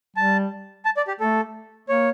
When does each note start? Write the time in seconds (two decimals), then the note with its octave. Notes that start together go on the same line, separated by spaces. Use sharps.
0.16 G3 A5
0.85 A5
0.97 D5
1.08 G4
1.20 A3 A4
1.89 A#3 C#5